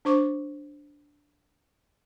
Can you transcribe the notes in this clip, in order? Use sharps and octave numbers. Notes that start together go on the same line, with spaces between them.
D4 C5 C#6 D6